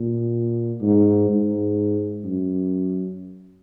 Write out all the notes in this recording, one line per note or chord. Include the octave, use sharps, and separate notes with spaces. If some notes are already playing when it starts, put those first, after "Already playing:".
Already playing: A#2
G#2
G#2
F#2